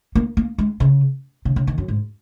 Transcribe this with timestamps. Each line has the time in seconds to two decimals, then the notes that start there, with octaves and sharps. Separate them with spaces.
0.15 A#3
0.37 A#3
0.58 G#3
0.80 C#3
1.45 C#3
1.56 C#3
1.67 D#3
1.78 F#2
1.88 G#2